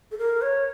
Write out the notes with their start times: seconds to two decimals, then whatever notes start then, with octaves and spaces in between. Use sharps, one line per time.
0.11 A4
0.18 A#4
0.42 C#5